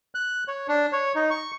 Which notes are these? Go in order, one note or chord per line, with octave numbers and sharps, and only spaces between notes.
F#6
C#5
D4
C#5
D#4
C#6